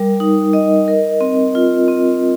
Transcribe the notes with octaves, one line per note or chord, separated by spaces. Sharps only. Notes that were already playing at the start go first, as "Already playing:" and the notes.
Already playing: G3 A#4
D#4
D#5
A#4
C4
F4
C4